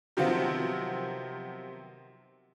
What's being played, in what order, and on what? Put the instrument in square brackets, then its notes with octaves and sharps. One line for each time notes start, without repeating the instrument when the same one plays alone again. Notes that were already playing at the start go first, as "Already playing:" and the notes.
[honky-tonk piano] C3 D#3 F3 F#3 B3 C4